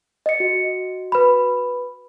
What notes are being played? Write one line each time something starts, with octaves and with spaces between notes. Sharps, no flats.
D#5 C#7
F#4
B4 B5